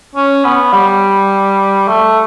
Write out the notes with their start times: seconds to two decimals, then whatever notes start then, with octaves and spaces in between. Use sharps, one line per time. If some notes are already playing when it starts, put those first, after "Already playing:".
0.16 C#4
0.45 B3
0.73 G3
1.88 A3